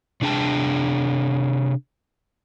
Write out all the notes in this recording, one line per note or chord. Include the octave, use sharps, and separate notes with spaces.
C3 D4 G#4 G5 A5